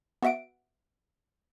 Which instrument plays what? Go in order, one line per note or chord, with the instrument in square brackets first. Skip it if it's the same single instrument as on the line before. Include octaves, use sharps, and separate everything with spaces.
[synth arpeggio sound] B3 F#4 E5 F#5 D7